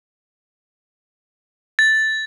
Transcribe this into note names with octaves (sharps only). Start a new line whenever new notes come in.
A6